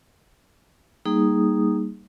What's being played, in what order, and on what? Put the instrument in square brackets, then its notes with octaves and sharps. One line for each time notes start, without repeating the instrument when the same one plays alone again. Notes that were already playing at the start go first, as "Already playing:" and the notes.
[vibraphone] G3 A#3 D#4 G#4 D#6